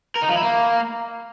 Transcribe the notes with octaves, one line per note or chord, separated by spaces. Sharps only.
A#4
D#4
F3
E4
A#3